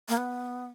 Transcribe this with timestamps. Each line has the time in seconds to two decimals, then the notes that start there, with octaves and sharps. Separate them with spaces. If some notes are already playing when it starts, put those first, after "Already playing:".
0.09 A#3
0.17 B3